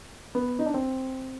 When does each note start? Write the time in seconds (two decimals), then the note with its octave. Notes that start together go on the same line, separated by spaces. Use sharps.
0.35 B3
0.59 D#4
0.66 D4
0.74 C4